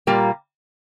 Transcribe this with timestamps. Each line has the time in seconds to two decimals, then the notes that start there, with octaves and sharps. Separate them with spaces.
0.07 A#2 G3 A#3 F4